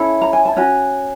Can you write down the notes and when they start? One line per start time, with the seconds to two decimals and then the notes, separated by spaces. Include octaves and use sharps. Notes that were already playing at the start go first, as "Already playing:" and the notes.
Already playing: C#4 E4 A4
0.21 A#5
0.33 G#5
0.45 A5
0.57 C#4 F#4 G#5